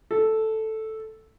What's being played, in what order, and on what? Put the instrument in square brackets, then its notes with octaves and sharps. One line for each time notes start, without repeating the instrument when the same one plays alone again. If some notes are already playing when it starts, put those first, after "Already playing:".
[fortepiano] A4